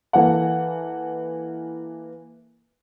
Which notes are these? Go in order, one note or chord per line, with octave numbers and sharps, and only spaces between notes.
E3 A#3 A4 F#5